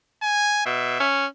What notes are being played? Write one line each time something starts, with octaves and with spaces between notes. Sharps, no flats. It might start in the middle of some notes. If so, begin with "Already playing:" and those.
G#5
B2 E5
C#4